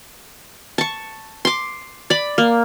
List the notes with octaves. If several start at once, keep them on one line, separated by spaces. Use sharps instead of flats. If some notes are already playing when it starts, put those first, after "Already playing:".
A5 C#6
C6 D6
D5 B5
A#3